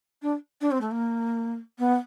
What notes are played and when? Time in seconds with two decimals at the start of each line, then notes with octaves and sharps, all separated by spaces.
0.22 D4
0.61 D4
0.71 C4
0.81 A3
0.91 A#3
1.78 B3